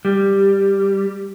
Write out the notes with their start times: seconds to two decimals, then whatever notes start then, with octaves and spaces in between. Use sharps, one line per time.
0.05 G3